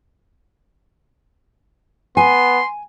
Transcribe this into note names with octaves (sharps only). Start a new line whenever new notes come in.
B3 G#5 C6